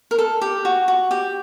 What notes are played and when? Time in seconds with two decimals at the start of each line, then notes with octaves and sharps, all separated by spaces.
0.11 A#4
0.18 A4
0.42 G4
0.65 F#4
0.88 F#4
1.11 G4